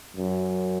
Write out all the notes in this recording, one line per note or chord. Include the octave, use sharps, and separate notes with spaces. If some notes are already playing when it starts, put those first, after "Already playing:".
F#2